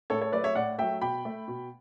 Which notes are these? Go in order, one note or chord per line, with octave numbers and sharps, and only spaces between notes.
A2 A4 C#5
A4 C#5
F#3 A3 B4 D5
C#5 E5
A2 D5 F#5
F#3 A3 E5 G5
B2 G5 B5
A3
B2